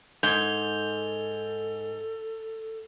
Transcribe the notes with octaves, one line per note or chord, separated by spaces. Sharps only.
G#2 A4 G6 G#6 F7 G7